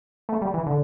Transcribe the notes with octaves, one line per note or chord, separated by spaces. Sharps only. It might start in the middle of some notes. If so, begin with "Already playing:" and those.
A3
G3
E3
D3